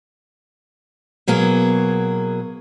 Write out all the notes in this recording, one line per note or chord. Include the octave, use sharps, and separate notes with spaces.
B2 F#3 A#3 G#4